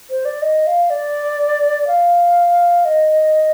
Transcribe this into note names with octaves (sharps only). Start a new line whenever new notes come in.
C5
D5
D#5
F5
D5
F5
D#5